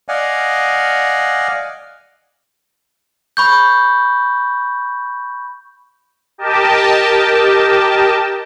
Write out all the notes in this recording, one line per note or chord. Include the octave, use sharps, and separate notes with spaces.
D5 D#5 F5 F#5 G#5
B5 C#6 G6
G4 A#4 D#5 G5 A5